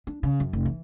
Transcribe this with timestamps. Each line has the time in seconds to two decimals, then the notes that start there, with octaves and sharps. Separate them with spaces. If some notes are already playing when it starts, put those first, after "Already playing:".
0.07 D4
0.23 C#3
0.40 F#2
0.53 F1
0.66 E3